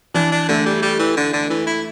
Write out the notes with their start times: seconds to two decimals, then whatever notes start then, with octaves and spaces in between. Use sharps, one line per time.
0.14 E3 D4
0.32 D4
0.48 D3 A3
0.66 G3
0.82 G3
0.99 E3
1.17 D3
1.33 D3
1.50 E3
1.67 E4